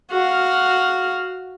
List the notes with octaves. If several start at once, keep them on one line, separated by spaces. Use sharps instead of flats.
F#4 F5